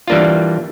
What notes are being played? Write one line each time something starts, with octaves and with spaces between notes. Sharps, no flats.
E3 G3 A#3 D4 F4